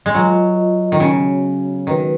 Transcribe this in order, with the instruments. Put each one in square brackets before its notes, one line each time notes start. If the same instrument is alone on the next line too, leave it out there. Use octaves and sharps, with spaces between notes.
[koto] G#3
[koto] F#3 [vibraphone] F4 B4 D#5
[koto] D#3
[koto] C#3 [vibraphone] B3 F#4 C#5
[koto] D#3 [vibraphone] G#3 B3 F#4 B4